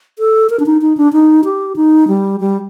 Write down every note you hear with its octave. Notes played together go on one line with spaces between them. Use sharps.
A4
A#4
D4
D#4
D#4
D4
D#4
G4
D#4
G3
G3